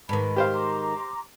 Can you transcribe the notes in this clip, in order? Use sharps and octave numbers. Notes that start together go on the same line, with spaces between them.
G#2 D#3 B4 A5 B5
G4 C5 F5
A#5 C6 D6